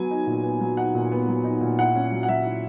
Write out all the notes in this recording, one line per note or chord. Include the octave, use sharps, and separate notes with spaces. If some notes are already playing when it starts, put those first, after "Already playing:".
Already playing: F#3 B3 G#5
D#4
A#2
B3
F#3
D#4 F#5
A#2
B3
F#3
D#4
A#2
E4 F#5
C#4
F#3
F#5
F#3 E5
E4